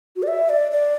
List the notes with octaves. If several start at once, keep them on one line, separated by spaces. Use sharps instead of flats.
F#4
D5
E5
D5
D5